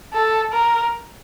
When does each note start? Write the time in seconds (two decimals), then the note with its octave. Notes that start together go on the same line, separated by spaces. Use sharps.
0.13 A4
0.53 A#4